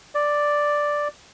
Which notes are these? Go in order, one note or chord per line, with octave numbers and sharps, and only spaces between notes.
D5